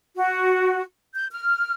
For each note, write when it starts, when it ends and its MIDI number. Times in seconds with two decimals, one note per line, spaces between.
0.16 0.82 66
1.15 1.26 91
1.32 1.73 89